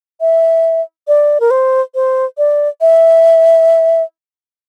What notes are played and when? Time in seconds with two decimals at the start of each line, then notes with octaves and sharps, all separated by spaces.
0.21 E5
1.08 D5
1.40 A#4
1.51 C5
1.95 C5
2.38 D5
2.81 E5